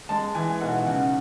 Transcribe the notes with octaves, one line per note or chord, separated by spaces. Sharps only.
G#3 A5
E3 G#5
B1 F#5
C#3 F#5